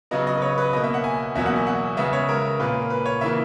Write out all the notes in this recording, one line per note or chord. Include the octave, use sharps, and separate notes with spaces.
C#3 F#3 B3 D#5
D#5
B4
C#5
B4
B2 A#3 D#5
E5
F#5
G#5
E2 B2 F#3 A#3 E5
F#5
G#5
F#5
C#3 G#3 B3 E5
C#5
A#4
A#2 A#3 B4
B4
C#5
C#3 E3 A#3 E5